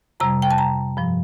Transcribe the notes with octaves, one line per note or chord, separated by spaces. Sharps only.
F2 C3 G3 A#5
G5
A5
A#5
G2 F3